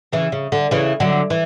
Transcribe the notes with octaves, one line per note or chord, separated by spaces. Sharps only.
C#3 E3
C#3
D3
C#3 E3
D3 F#3
E3